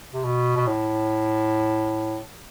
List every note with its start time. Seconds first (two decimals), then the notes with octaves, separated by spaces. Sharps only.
0.14 C3
0.24 B2
0.56 B2
0.67 A2